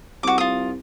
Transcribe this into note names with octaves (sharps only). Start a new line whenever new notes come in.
C2 F#4 D6
F4 D#6